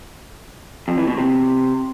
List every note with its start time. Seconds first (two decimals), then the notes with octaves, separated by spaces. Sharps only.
0.88 F2
0.98 E3
1.07 B2
1.17 C3